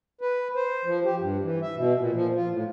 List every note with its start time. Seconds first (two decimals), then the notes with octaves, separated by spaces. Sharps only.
0.21 B4
0.56 C5
0.85 F3
1.05 G4
1.20 G2
1.42 E3
1.62 E5
1.76 B2
1.99 A#2
2.14 F3
2.36 F4
2.51 A2